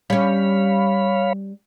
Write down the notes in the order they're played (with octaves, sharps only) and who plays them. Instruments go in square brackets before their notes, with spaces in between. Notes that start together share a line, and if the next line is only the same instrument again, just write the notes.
[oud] G3 C#4 [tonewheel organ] C#5 F5 B5